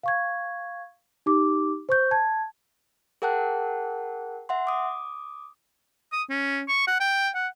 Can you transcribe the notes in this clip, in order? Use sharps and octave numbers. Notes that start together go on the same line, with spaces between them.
F5 C#6 G#6
D#4 G4 D6
C5 C#6 G6
A5 G#6
G#4 A#4 F#5 G5 A5 F#6
E5 F#5 C6
D6 D#6
D#6
C#4
C#6
F#5
G5
F#5